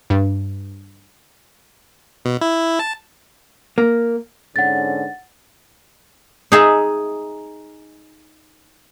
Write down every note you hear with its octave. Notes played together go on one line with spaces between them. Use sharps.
G2
B2
E4
A5
A#3
G#2 D3 C#4 F#5 A6
D#4 G#4 E5